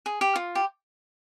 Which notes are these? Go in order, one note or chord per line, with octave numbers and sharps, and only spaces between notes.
G#4
G4
F4
G4